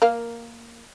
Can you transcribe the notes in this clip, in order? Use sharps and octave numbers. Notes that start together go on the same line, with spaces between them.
A#3 A#4 F5